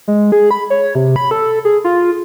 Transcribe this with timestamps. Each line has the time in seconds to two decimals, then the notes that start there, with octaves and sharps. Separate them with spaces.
0.08 G#3
0.32 G#4
0.51 B5
0.70 C#5
0.95 C3
1.16 B5
1.31 A4
1.65 G#4
1.84 F4